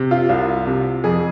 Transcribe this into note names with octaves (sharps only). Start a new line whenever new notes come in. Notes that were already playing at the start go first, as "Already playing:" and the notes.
Already playing: C3
F4
C2 F4
C3
F2 G#4